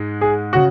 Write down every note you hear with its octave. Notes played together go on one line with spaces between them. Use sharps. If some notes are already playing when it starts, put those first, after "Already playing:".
Already playing: G#2 G#3
G#4
C#3 F#4